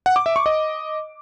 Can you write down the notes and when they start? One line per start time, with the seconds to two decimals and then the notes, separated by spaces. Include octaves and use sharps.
0.06 F#5
0.16 D6
0.26 E5
0.36 C#6
0.46 D#5